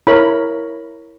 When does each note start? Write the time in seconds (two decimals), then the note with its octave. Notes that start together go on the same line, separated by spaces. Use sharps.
0.07 E4 A#4 C#5 B5